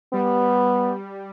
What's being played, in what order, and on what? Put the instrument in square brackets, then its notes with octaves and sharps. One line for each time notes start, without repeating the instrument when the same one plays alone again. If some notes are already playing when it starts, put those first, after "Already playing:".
[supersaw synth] G3 [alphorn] B3